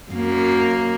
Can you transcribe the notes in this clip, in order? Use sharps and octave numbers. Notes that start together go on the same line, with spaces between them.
F#2 A#3